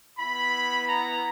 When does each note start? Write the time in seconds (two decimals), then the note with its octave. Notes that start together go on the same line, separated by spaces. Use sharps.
0.18 B3 E4 B5
0.88 A#5